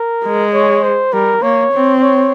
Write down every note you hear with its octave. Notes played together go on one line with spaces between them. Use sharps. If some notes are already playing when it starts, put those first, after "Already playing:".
Already playing: A#4
G#3
C#5
C5
G3 A#4
A#3 C#5
C4
C#5